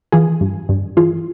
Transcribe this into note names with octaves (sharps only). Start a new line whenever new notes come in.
E3 F4 G#4
G2
G2
E3 F4 G#4